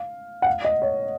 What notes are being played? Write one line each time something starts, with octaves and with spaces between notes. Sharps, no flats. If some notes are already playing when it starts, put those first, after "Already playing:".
Already playing: F5
F#5
F5
D#5
C#5